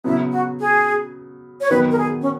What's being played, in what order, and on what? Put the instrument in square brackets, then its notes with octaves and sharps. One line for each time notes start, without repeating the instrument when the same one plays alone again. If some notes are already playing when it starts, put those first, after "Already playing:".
[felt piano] C#3 F#3 B3 [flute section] E4
[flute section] F#4
G#4
C#5
[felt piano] D#3 F#3 B3 F#4 [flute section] B4
[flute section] A#4
G#4
C#4